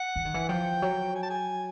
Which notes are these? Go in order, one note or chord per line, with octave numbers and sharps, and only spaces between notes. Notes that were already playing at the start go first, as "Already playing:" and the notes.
Already playing: F#5
E3
D#3
E3
F3 G5
F#3
G#5
A5
G#5